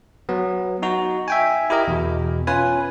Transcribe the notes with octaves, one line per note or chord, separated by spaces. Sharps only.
F#3 B3
D#4 F#4
E5 G5 G#5
E4 G4 A#4 D#5
E2 B2
C#4 F4 B4 G#5